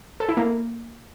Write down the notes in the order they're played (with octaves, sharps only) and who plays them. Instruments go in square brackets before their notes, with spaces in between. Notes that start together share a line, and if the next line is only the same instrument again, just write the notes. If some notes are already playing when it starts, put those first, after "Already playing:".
[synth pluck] A4
E4
A#3